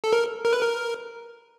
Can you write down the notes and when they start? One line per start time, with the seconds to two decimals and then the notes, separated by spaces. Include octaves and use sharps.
0.04 A4
0.13 A#4
0.45 A#4
0.53 B4
0.61 A#4